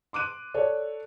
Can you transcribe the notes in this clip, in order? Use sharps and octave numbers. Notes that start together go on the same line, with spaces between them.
C6 D6 F#6 D#7
A4 C#5 D5